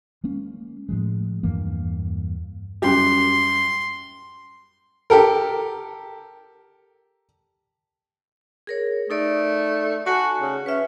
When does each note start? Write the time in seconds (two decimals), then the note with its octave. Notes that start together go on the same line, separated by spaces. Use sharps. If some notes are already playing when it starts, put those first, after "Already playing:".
0.24 G#3 A#3 C#4
0.89 A2 F3 G#3
1.43 E2 G2 E3 A#3
2.82 F#2 G3 G4 C6
5.10 G4 A4 A#4
8.67 G#4 A#4 C#5
9.10 A3 D#4 A4 D5
10.06 F#4 G#5 A5
10.42 C#3
10.66 C#4 B4 E5